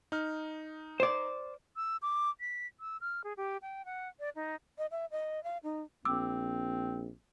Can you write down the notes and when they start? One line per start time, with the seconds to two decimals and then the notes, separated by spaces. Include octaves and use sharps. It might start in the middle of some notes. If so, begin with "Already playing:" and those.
0.12 D#4 F6
1.00 C5 D5
1.76 E6
2.02 D6
2.41 B6
2.80 E6
3.01 F6
3.24 G#4
3.37 G4
3.62 G5
3.85 F#5
4.20 D5
4.35 D#4
4.78 D#5
4.91 E5
5.11 D#5
5.44 F5
5.63 D#4
6.05 A#1 C4 D6 E6